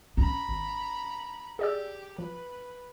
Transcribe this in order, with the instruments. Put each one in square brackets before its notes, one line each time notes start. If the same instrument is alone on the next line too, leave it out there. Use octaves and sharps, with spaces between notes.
[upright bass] C#4 [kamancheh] A#5 B5
[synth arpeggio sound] G#1
[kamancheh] G4 [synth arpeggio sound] G#4 D5 E6
[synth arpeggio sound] F3 [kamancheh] B4